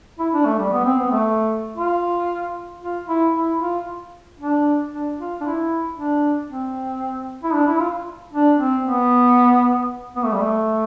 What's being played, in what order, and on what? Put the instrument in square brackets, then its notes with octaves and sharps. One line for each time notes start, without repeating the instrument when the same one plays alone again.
[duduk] E4
D4
A3
G3
B3
C4
B3
A3
F4
F4
E4
E4
F4
D4
D4
F4
D4
E4
D4
C4
E4
D4
E4
F4
D4
C4
B3
B3
A3
G3
A3